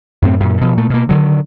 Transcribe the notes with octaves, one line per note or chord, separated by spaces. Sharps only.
F#2 A2 C4
F#2 A#2
B2 F3
A#2 A3
B2 A#3
D3 D#3 F#3